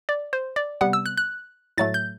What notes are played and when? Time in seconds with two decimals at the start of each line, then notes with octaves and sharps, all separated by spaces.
0.09 D5
0.33 C5
0.56 D5
0.81 C3 G3 B3 F#5
0.93 E6
1.06 F#6
1.17 F#6
1.78 A2 F#3 A3 A6
1.94 G6